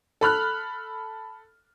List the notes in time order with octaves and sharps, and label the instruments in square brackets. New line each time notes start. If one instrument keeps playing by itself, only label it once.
[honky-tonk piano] A4 B5 F6 F#6